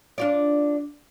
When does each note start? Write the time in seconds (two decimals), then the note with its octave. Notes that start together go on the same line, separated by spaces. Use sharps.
0.18 D4 F4 D5